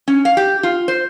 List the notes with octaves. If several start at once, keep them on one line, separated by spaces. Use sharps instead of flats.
C#4
F5
G4
F4
C5